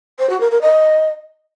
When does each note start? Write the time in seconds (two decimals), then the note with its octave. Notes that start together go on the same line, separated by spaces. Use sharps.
0.19 C5
0.29 F#4
0.40 A#4
0.51 A#4
0.61 D#5